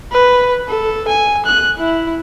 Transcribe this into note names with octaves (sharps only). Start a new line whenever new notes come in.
B4
A4
G#5
F#6
E4